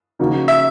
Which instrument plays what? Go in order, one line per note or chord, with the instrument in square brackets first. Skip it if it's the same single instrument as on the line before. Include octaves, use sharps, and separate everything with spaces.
[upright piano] C#3 F3 A#3 D#4 F#4
[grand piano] E5